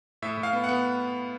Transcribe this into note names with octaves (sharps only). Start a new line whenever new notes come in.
A2 E5
A2
F5
B3
B3 F#5